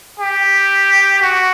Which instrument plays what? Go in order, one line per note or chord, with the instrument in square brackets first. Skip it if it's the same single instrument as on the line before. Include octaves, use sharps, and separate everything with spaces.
[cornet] G4
F#4